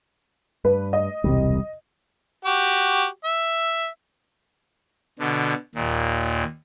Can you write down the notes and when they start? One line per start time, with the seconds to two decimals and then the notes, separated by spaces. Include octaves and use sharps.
0.65 G2 B4
0.93 D#5
1.24 E1 C2 C3 G3
2.45 F#4 G4
3.24 E5
5.19 B2 D3
5.75 D#2 A#2